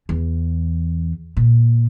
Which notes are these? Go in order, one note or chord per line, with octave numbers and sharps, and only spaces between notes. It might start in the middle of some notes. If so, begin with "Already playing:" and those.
E2
A#2